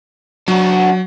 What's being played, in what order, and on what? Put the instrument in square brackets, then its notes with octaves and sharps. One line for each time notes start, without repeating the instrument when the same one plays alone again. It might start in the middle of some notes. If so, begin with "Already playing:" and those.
[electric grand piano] F#3 [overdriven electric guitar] D4 F#4